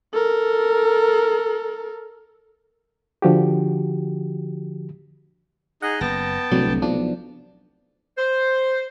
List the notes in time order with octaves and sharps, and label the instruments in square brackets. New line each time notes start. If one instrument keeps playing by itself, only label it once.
[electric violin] A4 A#4
[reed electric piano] D3 F3 F#4 G4
[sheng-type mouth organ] D#4 G#4 D#5 [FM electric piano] F#5
[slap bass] F#1 [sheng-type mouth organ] B3 G5 A5 [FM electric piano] A#6
[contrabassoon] D1 [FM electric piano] C2 F#3 D4 [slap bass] C3 A3
[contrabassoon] B1 [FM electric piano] F3 D4
[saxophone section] C5